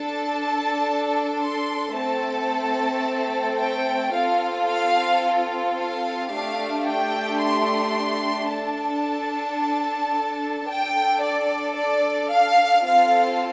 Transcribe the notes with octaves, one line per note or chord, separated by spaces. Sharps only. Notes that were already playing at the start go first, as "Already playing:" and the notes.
Already playing: D4 A4 A5
C6
A3 C4 A4 A5
G5
C4 F4 A4 F5
F5
F5
A3 D4 G4 F5
G5
C6
D4 A4 A5
D4 A4 G5
D5
D5
F5
C4 F4 A4 F5